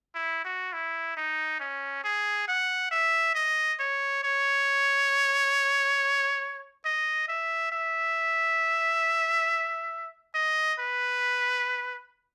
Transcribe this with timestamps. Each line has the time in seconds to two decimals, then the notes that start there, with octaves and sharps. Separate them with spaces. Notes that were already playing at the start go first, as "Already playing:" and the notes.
0.15 E4
0.45 F#4
0.73 E4
1.17 D#4
1.60 C#4
2.04 G#4
2.48 F#5
2.91 E5
3.35 D#5
3.79 C#5
4.23 C#5
6.85 D#5
7.28 E5
7.72 E5
10.34 D#5
10.79 B4